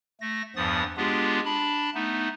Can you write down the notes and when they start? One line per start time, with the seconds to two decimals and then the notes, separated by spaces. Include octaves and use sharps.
0.21 A3 A#6
0.56 E2 G2 F3 B3 D#6 A6
0.97 G#3 B3 D4 F4 G4 G#4
1.45 D4 A5 B5
1.95 A3 B3 D#4